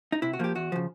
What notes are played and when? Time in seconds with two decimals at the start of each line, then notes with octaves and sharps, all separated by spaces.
0.12 D#4
0.22 C3 E4
0.33 F#4
0.39 F3 A#3 G4
0.55 E2 F#4
0.72 C#3 F3